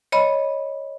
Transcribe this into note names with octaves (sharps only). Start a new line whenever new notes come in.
C#5 D#5 B5